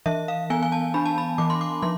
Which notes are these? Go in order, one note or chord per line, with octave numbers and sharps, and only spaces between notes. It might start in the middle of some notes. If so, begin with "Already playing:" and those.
E3 E5
F5
B3 G#5
G#5
A5
D4 B5
A5
B5
E3 D6
C6
D6
F3 C6